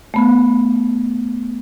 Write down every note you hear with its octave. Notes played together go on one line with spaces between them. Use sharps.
A3 B3